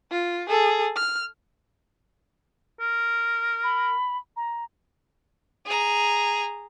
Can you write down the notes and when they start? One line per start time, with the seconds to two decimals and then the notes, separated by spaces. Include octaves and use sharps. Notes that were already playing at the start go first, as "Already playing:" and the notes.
0.11 F4
0.49 G#4 A4
0.96 F6
2.80 A#4
3.64 B5
4.37 A#5
5.66 G#4 A#5